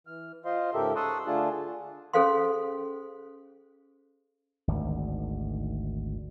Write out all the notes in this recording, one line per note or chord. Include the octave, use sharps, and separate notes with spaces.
E3 F6
F4 C5 D#5 F5 C6
G#2 C#3 G4 A4 A#4 E5
A5 C6 C#6 D#6 E6 F#6
D3 A3 D4 F4 G#4 A5
C#4 G#4 A4 C5 F5 C6
G#1 D2 D#3